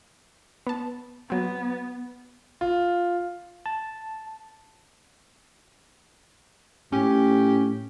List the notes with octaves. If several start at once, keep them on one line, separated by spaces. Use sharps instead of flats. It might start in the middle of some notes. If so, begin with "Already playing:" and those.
B3 A5
F#3 B3 C4
F4
A5
A2 C#4 G4